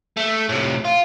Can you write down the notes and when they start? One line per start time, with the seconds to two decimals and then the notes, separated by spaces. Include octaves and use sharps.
0.17 A3
0.49 A2 C3
0.84 F4